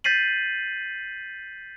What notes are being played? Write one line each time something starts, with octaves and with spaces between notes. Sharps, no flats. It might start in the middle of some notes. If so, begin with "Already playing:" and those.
G6 A6 B6 C7 D#7 F#7